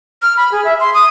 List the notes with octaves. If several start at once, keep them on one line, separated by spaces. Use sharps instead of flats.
F6
B5
G#4
E5
C6
D#6